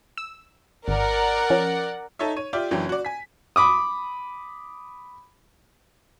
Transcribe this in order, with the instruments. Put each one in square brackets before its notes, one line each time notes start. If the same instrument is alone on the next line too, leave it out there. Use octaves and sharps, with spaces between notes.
[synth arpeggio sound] E6
[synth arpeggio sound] G#1 [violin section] A#4 D5 F#5
[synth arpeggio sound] F3 C#4
[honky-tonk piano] D#4 A4 C#5 E5
C#5 D#7
F4 G4 D5 E5 G5
F#1 E3 F#3 D4 G5
F#4 D5
G#5 B6
[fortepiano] B5 D6 D#6